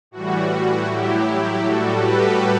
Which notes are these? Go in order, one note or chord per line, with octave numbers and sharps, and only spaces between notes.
A2 E3 G3 F#4
A2 F#3 E4 G4
A2 G3 F#4 A4
G4 B4